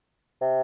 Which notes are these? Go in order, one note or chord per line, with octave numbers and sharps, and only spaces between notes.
C3